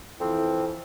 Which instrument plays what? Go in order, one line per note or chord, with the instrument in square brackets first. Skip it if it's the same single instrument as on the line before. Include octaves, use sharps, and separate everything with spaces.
[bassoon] F2 [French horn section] E3 E4 [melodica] C4